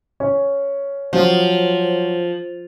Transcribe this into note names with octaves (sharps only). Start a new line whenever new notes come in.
C#4
F3 F#3 C#4